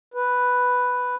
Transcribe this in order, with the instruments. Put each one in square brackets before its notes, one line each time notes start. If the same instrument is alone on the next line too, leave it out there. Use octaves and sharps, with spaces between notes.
[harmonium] B4